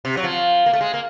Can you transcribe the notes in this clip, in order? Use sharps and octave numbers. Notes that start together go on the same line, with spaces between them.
C3
F#3
F3
A#3
A3
G#3
A#3